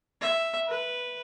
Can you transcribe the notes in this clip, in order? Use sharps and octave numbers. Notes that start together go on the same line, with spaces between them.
E5
B4